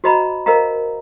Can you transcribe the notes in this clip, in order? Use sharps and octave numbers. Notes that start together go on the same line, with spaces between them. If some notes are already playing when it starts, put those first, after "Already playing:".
F#4 C5 D#5 A#5 B5
A#4 C5 D#5 F5 A#5